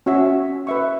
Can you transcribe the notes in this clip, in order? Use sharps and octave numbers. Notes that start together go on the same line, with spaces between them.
C#4 F#4 C#5 E5
B4 E5 C#6